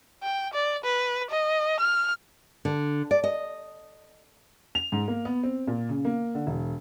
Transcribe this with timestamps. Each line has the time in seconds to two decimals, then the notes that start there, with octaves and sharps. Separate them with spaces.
0.23 G5
0.54 D5
0.84 B4
1.31 D#5
1.80 F6
2.65 D3
3.11 D5
3.24 D#5
4.75 F7
4.92 G#2
5.08 A#3
5.25 B3
5.43 C4
5.67 A#2
5.89 C#3
6.05 A#3
6.35 D3
6.47 E1